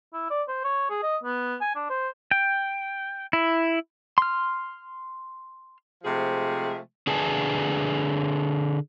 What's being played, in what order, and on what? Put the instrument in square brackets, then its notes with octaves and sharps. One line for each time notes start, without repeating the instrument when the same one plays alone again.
[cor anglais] E4
D5
C5
C#5
G#4
D#5
B3
G#5
D4
C5
[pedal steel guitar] G5
E4
C6 F6
[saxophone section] C3 F3 G#3 A3 G#4
[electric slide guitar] D3 G#4 B4 D5 G#5 A5